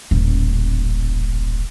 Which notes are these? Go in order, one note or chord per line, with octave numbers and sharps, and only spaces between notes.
D#1 A1